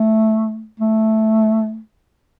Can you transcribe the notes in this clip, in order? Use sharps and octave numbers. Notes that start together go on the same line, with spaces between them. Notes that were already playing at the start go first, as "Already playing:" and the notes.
Already playing: A3
A3